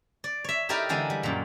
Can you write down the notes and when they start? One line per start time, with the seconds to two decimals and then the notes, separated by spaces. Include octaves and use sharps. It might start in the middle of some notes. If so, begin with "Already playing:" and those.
0.24 D5
0.44 C#5 E5
0.69 D#4 E4 G4 A4 A#4 D5
0.89 D3 E3 G#3 D4
1.10 G3
1.23 F#2 A#2